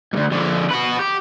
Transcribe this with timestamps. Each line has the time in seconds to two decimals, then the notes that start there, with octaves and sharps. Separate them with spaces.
0.14 D2 G#2
0.32 F2 D3
0.71 F#4 B4
0.99 G4